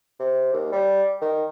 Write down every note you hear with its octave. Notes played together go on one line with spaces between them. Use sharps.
C3
D#2
G3
D#3